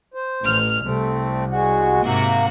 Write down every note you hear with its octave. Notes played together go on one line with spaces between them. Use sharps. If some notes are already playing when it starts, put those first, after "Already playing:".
C5
A1 F6
C2 A3 C4
G#3 F#4
G#2 C3 A#3 F#4